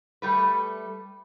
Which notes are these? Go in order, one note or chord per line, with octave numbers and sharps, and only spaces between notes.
G3 A3 B4